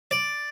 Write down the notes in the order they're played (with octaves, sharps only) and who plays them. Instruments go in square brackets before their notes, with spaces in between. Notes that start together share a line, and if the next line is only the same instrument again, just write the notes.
[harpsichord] D5